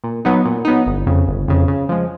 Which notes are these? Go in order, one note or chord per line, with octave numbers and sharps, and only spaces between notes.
A#2
F#3 B3 D#4
A#2
F#3 B3 D#4
G1
F2 C#3
G1
F2 C#3
C#3
F3 G#3